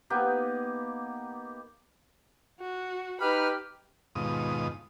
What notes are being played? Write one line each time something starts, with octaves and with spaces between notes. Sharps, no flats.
A#3 B3 D#4 G4
F#4
D#4 G4 B4 B5 F6
D#2 G#2 B2 F4 D#6